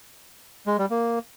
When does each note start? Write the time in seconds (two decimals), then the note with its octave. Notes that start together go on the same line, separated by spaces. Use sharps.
0.67 G#3
0.79 G3
0.90 A#3